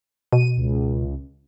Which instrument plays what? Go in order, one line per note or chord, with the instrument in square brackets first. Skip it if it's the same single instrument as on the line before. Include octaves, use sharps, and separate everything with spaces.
[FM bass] B2 [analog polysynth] D#7
[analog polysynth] C#2